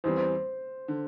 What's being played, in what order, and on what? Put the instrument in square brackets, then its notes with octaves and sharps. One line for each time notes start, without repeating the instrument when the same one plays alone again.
[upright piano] E2 E3 G3 C4 [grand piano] C5
[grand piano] C5
[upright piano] D3